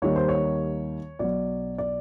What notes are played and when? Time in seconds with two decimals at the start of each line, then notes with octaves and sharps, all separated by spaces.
0.02 D#2 D#3 G3 A#3 C#5
0.16 C5
0.28 C#5
1.19 B1 B2 F#3 D5
1.78 D5